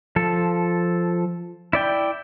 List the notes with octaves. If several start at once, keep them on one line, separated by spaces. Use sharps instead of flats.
F3 A4
E4 D5 G5